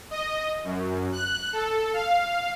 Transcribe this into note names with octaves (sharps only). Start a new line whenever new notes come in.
D#5
F#2
F#6
A4
F5